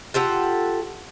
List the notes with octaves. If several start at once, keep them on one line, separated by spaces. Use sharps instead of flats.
F4 G4 A4 F#5